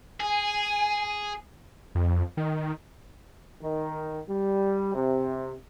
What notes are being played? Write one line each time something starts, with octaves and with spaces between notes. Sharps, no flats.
G#4 G#5
F2
D#3
D#3
G3
C3